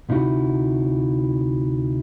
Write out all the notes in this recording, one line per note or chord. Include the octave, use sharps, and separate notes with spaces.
D2 C3 D#4 E4 F#4